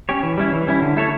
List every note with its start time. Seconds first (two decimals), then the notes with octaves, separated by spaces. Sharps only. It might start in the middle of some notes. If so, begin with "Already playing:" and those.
0.09 C#4 G4 C#5
0.23 E3
0.38 G3 C#4 E4
0.52 E3
0.67 G3 C#4 E4
0.82 D3
0.97 A3 E4 A4 C#5